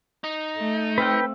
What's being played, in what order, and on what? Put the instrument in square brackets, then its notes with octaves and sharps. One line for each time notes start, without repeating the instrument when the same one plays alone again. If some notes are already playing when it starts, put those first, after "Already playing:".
[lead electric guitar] D#4
[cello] A3
[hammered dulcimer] C4 E5 F5 [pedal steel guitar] B4 G5